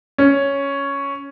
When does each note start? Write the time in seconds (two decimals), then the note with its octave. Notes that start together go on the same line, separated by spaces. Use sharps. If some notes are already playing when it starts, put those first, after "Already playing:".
0.18 C#4